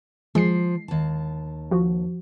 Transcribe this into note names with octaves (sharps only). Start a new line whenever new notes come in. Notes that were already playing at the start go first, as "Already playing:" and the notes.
F3 G#3 C7
D#2 A5
F3 F#4